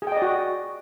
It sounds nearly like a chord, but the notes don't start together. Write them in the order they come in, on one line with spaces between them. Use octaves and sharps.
G#4 G5 D#5 D5 F#4